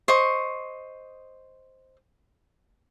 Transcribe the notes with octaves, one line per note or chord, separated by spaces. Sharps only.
C5 D#5 C#6